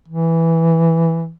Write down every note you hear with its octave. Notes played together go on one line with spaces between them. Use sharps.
E3